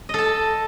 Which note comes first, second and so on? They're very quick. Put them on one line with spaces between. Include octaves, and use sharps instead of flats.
D#5 A4 A5